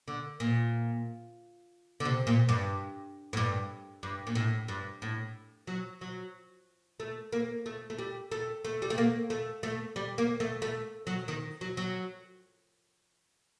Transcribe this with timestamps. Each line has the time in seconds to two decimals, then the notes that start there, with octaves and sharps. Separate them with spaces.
0.08 D3
0.40 A#2
2.00 D3
2.05 C3
2.27 A#2
2.49 G2
3.33 A2
3.37 G2
4.03 G2
4.27 A#2
4.35 A2
4.68 G2
5.02 A2
5.67 F#3
6.01 F#3
7.00 A3
7.32 A#3
7.66 A3
7.90 A3
7.99 G3
8.32 A3
8.65 A3
8.82 G3
8.90 A3
8.98 A#3
9.30 A3
9.63 A3
9.96 G3
10.18 A#3
10.40 A3
10.62 A3
11.07 F#3
11.28 D#3
11.61 F#3
11.77 F#3